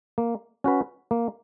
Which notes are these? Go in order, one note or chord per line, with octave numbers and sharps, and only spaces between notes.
A#3
C#4 F#4 B4
A#3